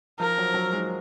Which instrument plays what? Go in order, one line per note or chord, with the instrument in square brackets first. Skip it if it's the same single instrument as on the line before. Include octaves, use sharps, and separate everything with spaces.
[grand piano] F3 [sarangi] A#4
[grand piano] F#3
F#3
G#3